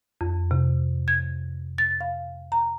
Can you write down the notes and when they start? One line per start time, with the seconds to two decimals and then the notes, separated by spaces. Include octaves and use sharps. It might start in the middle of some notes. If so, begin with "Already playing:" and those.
0.21 F2
0.51 C3
1.08 G#6
1.78 A6
2.01 F5
2.52 A#5